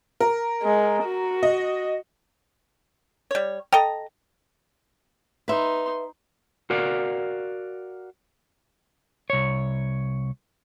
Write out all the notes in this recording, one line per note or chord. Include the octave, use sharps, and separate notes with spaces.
A#4
G#3
F#4
D#5
G3 C#5
A4 D#5 G5 A#5
D#4 B4 E5 C6
F#4 A#4 D5 F5
C2 C#5